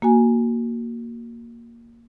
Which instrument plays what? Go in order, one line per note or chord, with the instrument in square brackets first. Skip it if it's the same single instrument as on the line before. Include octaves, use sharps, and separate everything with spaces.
[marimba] A#3 F#4 G#5